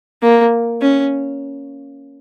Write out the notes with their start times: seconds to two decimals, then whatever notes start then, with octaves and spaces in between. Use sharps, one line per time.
0.22 A#3
0.82 C#4